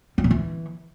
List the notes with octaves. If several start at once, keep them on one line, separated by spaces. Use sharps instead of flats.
G3
A#2
E3